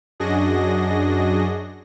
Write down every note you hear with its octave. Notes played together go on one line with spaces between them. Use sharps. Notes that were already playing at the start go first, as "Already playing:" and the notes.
F#2 D4 F#4 G#4 D#5 A#6